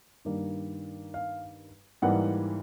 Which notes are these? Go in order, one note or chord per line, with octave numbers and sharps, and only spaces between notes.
G2 D#3 G3 A#3
F5
G#2 E3 G3 A#3 F#5